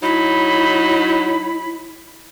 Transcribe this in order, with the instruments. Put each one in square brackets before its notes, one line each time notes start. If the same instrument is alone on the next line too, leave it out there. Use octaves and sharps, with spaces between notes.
[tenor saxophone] F#3 [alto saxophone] D#4 [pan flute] E4 [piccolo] B5